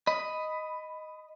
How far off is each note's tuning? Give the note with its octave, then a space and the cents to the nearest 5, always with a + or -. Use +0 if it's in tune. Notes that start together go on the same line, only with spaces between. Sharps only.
D#5 +0 B5 +10